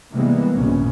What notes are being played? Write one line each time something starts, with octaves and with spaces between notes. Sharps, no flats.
C3 E3 G3 G#3 A#3 B3
A#1 G2 A#2 C#3 B3 C#4